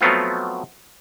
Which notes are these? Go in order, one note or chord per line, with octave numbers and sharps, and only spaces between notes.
F3 F#3 A3 B3 C4 F4